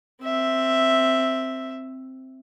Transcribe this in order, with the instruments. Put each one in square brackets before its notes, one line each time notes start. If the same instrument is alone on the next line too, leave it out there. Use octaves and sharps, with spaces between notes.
[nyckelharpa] C4 E5